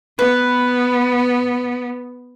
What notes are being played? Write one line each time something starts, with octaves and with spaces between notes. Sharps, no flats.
B3 B4